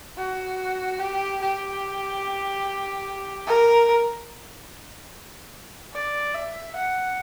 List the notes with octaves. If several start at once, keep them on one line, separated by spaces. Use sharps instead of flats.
F#4
G4
G4
A#4
D5
E5
F#5